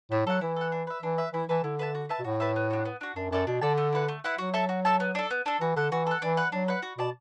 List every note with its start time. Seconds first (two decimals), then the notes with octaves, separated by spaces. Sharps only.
0.11 A2 E4
0.27 F#3 A4 F#5
0.41 E3 E4
0.56 A4 F#5
0.72 D4
0.87 B4 E5
1.02 E3 D4
1.18 B4 E5
1.33 E3 E4
1.49 E3 B4 E5 A5
1.63 D3 E4
1.79 B4 E5 A5
1.95 F#4
2.09 B4 E5 A5
2.19 B2
2.24 A2 F#4
2.40 B4 E5 A5
2.56 B3
2.70 D4 F#4
2.85 B3
3.01 D4 F#4
3.16 F#2 D4
3.31 F#2 A4 D5 A5
3.47 B2 D4
3.61 D3 A4 D5 A5
3.77 A3
3.93 E4 B4 F#5
4.08 A3
4.24 E4 B4 F#5
4.38 F#3 F#4
4.54 A4 E5 A5
4.69 F#4
4.85 A4 E5 A5
5.00 B3
5.15 D4 A4
5.30 B3
5.46 D4 A4
5.61 E3 F#4
5.76 D3 A4 F#5
5.92 E3 F#4
6.07 A4 F#5
6.22 E3 D4
6.37 B4 F#5
6.52 F#3 D4
6.68 B4 F#5
6.82 F#4
6.98 B2 D5 A5